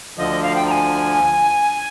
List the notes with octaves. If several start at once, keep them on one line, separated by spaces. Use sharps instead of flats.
D2 D3 F3 D#5
F5
G5
A#5
G#5